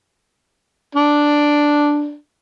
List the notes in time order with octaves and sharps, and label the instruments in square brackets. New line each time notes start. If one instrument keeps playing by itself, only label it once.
[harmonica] D4